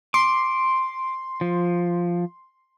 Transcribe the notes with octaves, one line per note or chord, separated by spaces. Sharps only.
C6 D6
F3